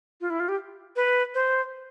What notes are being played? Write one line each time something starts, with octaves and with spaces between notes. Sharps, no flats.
F4
E4
F4
G4
B4
C5